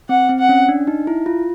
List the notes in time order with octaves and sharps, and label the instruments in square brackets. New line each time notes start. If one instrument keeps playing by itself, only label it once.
[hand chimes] C4 [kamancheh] F#5
[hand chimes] C4
[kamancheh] F#5
[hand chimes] C#4
D4
D#4
E4
F4